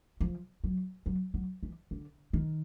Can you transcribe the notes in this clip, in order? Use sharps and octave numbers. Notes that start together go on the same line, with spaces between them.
F3
F#3
F#3
F#3
E3
D3
D#3